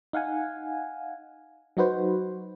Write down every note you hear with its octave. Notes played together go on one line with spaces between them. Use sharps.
D#4 F5 F#5 G#5
F#3 D#4 F#4 B4 C5